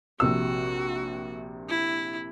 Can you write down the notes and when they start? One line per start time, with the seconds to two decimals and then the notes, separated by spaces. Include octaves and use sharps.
0.20 A#1 C3 F#4 E6
1.69 E4